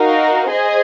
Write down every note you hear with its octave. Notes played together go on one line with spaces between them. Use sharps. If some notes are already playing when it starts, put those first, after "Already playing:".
Already playing: D#4 F#4 A#4 F5
G#4 C5 D#5 G#5